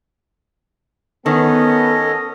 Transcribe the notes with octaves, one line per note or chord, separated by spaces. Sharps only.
D#3 B3 C#4 A4 D#5